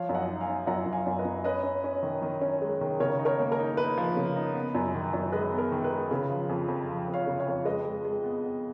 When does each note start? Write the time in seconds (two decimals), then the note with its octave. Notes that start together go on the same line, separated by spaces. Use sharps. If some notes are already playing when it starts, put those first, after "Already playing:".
Already playing: F3 C#5 F5
0.09 F#2
0.15 D#5 F#5
0.28 D#4
0.41 F5 G#5
0.47 D#4
0.67 F#2 F#5 A#5
0.86 F#2
0.92 F5 G#5
1.06 F#2
1.19 B4 D#5
1.25 F#2
1.44 C#4 B4 D#5
1.63 C#4
1.84 C#4
2.03 D#3
2.22 D#3
2.41 C#4
2.62 G#3
2.81 D#3
3.00 C#3 A#4 C#5
3.19 D#4
3.25 A#4 C#5
3.39 A#3
3.52 A#4
3.59 D#4
3.77 D#4 B4
3.98 F3
4.16 C#3
4.36 D#4
4.55 B3
4.75 F#2
4.94 D#3
5.14 F#2
5.32 G#3 B4 D#5
5.53 B3
5.58 A#4
5.72 D#3
5.84 B4
5.91 G#3
6.11 C#3
6.30 F3
6.49 F2
6.68 F2
6.88 F3
7.08 F2
7.14 C#5 F5
7.27 C#3
7.40 C#5 F5
7.47 F2
7.65 G#3 B4 D#5
7.85 G#3
8.05 G#3
8.23 B3
8.43 B3